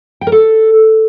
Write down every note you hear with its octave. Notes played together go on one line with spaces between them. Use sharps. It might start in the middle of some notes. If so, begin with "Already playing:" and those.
G5
A#4
A4